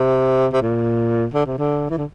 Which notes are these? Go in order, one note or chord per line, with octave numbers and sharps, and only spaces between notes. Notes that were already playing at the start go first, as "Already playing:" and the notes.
Already playing: C3
C3
A#2
D3
C3
D3
E3
D3